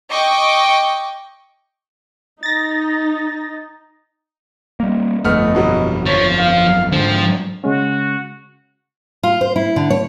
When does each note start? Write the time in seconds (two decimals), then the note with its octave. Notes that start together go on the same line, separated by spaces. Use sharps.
0.12 D#5 G5 C#6 D6
2.43 D#4 A6 A#6
4.80 G3 A#3
5.24 G1 F2 A3 B3 D#5 F6
5.55 B2 F#3 G3
6.06 F3 C#5 A6 B6
6.39 F5
6.92 G#2 D3 F3 C4
7.64 C#3 G#3 C#4 F#4
9.23 F4
9.41 C5
9.56 E4
9.76 D3
9.90 C#5